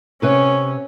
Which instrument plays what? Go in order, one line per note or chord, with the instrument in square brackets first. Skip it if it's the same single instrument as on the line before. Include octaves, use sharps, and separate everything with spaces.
[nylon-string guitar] C3 B4 C#5 [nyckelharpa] C#4